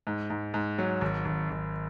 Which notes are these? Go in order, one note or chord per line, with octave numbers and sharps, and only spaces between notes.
G#2
G#2
G#2
F#3
G#1
G#1
G#1